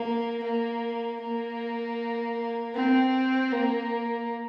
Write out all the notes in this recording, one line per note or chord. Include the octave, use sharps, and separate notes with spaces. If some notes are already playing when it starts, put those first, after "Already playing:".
Already playing: A#3
A#3
A#3
C4
A#3